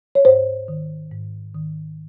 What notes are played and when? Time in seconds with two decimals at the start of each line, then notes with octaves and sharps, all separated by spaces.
0.15 C#5
0.25 G#2 C5
0.68 D#3
1.11 G#2
1.55 D#3